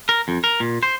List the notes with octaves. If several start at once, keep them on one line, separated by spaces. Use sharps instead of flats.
A#4
F2
A#4
A#2
C5